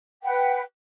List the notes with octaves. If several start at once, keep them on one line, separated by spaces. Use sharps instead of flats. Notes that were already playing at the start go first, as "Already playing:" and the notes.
B4 F#5 G5